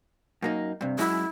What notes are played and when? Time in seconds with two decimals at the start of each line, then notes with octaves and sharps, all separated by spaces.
0.42 F#2 A#3 D#4
0.81 G2 C3
0.99 F#2 G#3 E4